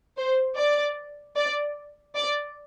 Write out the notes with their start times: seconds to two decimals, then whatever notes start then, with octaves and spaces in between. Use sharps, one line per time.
0.18 C5
0.57 D5
1.36 D5
2.15 D5